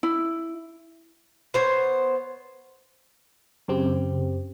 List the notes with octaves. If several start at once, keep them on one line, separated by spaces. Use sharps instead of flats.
E4
B3 C5 C#5
F#2 C#3 C4 G4